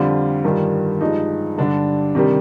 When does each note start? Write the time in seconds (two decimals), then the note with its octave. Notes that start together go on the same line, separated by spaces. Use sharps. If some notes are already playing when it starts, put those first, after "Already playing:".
Already playing: F2 D3 G3 F4
0.44 G2 D#3 G3
1.01 G2 F3 G#3 D#4
1.58 G2 D3 G3 D4
2.15 C3 D#3 G3